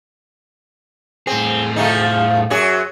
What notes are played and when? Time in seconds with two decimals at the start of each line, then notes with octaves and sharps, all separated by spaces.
1.27 A2 C4 G#4
1.76 F3 A3 D#4
2.50 F#2 F#3 G#4